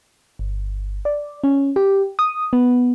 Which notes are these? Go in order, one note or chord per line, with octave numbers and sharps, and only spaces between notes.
G1
D5
C#4
G4
D#6
B3